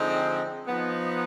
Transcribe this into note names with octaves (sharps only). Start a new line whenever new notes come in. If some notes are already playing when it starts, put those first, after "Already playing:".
Already playing: D3 F3 G#3 C4 D#4
F3 B3 D#4